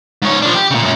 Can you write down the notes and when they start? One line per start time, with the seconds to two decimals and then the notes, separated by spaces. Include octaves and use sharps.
0.22 G#2 C#5
0.42 F3 D4
0.54 G4
0.71 A#2 C#3
0.82 F#2 A#2